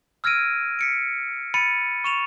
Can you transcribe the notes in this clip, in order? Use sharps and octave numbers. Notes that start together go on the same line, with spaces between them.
E6 F6 G#6 A#6 D7 D#7
B6 C#7 D7
B5 A6 C#7 D#7
C#6 E7 F7